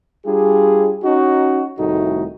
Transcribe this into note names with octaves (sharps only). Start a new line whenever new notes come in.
G3 D4 F4 G4 G#4
C#4 D#4 F#4
C2 A2 D#3 A3 D#4 F#4